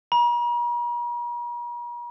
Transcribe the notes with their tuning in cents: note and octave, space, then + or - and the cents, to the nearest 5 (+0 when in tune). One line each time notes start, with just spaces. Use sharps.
A#5 +45